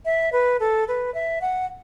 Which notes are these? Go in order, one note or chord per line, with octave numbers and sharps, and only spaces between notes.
E5
B4
A4
B4
E5
F#5